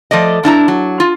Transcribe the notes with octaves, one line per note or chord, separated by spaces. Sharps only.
F3 A3 D5 D#5
G2 D4 E4 A#5
F#3
F4